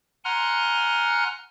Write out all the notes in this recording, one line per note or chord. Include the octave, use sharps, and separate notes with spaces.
F#5 G#5 A#5 C6 F6 F#6